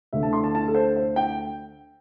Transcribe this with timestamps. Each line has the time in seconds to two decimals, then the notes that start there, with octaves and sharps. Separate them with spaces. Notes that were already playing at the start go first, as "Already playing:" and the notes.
0.13 D2 D3 A3 E5
0.23 A5
0.33 C6
0.44 A5
0.55 A5
0.68 A4
0.75 C5
0.96 C5
1.16 G5